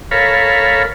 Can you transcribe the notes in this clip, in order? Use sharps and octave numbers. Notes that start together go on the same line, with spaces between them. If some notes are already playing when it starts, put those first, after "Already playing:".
A4 A#4 C#5 F5 B5